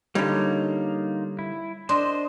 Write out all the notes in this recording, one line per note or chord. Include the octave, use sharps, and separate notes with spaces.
D3 G3 A#3 D#4 F4 C#5
E4
D4 C5 D#5 C6